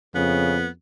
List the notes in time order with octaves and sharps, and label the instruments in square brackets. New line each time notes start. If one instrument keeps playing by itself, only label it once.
[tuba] F2 [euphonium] C#3 [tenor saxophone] B3